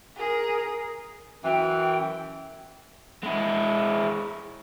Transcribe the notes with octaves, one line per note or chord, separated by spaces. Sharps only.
G#4 A#4
F#2 E3 G5
G#3 E4